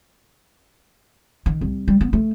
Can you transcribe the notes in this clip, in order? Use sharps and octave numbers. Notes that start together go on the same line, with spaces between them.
D#3
C2
G3
B3
A3